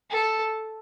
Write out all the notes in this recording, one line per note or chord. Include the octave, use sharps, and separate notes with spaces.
A4